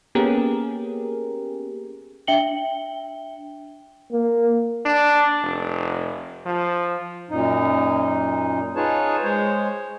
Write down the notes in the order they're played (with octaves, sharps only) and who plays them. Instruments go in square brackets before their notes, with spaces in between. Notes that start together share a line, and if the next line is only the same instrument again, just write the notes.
[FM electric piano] A#3 B3 C#4 G4 G#4 A#4
[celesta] D4 E5 G5 C#7 F#7 G7
[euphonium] A#3
[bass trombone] D4
F1
F3
[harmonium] F#2 A#2 D#4
D#4 F4 G#4 B4 C#5 A5
G#3 C5 C#5